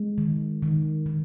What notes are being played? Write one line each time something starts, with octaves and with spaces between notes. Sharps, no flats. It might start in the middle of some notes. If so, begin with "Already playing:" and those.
Already playing: G#3
D#3
D#3
D#3